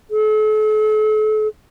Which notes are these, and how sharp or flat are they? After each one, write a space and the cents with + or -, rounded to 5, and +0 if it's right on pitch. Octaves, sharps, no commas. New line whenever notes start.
A4 -40